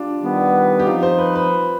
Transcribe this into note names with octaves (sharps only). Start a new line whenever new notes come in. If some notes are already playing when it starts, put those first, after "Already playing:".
Already playing: D4 F4 G4
D#3 G3 B3
G4
F3 C4 D#4 F4
C5
B4
B4